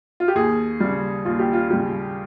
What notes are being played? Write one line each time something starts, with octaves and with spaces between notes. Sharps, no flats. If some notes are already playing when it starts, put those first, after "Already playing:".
F4
G4
D#2 G#4
C#3 G3
D#2 F4
G4
F4
C#3 G3 G4